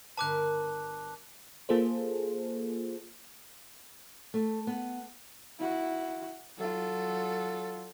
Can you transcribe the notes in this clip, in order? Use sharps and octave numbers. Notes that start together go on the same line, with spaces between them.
G1 A#4 B4 A5 D6 F#6
A#3 F4 G#4 A4 C5
A3
B3
E4 F#4
F#3 F4 A4